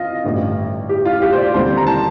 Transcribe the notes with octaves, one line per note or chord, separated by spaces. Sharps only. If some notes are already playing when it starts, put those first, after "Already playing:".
Already playing: F2 F4 D#5
A1 G2 D3
G4
F4
G4
C5
D5
D#2 D3 G3 C4 C5
A#5
A5